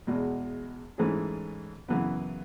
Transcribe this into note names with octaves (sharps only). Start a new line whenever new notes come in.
E2 B2 G#3
G#2 E3 A3 C#4 G#4
F#2 C#3 E3 B3